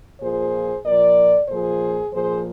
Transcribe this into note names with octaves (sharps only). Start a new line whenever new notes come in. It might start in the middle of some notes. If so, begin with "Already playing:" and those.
A#2 F3 G#4 C5
A#2 F3 A#4 D5
A#2 F3 G#4 C5
A#2 F3 G#4 C5